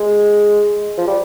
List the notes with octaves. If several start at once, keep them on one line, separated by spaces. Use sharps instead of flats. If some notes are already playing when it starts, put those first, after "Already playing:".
Already playing: G#3
F3
G3